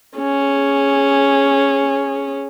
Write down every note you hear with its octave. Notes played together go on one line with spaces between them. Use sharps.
C#4 G#4